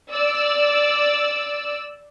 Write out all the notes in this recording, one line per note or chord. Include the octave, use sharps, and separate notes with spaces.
D5 E6